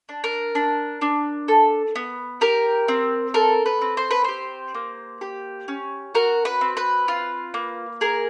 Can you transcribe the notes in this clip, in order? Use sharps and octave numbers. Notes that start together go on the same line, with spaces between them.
D4
A#4
D4
D4
A4
B3
G4 A#4
C4
A4 A#4
B4
C4
C5
B4
G4 C5
A#3
G4
C#4
F#4 A#4
B4
C4
B4
F4
A#3
G#4 A#4